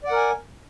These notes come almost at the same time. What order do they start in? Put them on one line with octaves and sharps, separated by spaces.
D5 F#5 A#4 G#5